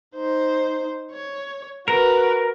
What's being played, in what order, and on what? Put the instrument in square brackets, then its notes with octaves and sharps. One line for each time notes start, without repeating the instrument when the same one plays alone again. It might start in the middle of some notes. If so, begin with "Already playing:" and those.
[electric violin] D#4 C5
C#5
[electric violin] F#4 B4 [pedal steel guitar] A#4